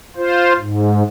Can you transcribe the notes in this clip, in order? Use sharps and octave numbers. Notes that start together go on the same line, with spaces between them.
F4 C5
G#2